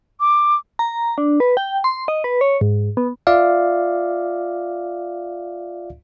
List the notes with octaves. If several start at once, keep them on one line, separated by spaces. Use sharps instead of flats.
D6
A#5
D4
B4
G5
C6
D#5
B4
C#5
G#2
B3
F4 D5 E5 F5